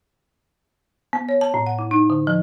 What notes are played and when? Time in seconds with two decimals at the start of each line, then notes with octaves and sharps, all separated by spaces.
1.13 B3
1.29 C#5
1.41 A5
1.54 A2
1.67 F#5
1.79 E4
1.91 D#4
2.10 D3
2.27 F3